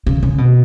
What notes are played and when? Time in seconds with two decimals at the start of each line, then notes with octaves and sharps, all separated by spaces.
0.06 C#3
0.23 C#3
0.38 B2